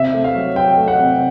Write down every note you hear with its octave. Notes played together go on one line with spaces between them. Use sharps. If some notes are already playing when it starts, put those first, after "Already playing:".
Already playing: C3 E5
A3
F5
F#3
F#3 G5
A3
F#5
C3